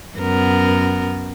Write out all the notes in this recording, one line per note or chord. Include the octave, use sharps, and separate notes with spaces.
F#2 B3 A#4